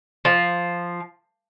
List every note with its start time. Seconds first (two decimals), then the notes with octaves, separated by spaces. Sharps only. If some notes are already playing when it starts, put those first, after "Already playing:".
0.25 F3